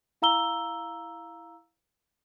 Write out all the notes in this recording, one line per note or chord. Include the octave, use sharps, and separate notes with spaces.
E4 F5 A#5 E6 G7